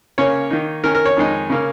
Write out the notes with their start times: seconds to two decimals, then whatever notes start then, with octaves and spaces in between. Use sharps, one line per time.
0.18 C#3 A#3 C#4 C#5
0.51 D#3 A#3 D#4
0.84 D#3 C#4 A#4
0.95 A#4
1.05 C#5
1.17 F2 D#3 G#3 D#4
1.50 C#3 A#3 C#4